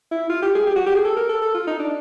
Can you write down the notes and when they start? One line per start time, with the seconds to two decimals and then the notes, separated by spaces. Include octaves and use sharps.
0.11 E4
0.30 F4
0.42 G4
0.55 G#4
0.67 G4
0.76 F#4
0.86 G4
0.95 G#4
1.05 A4
1.16 A#4
1.29 A4
1.42 A4
1.54 F4
1.67 D#4
1.79 D4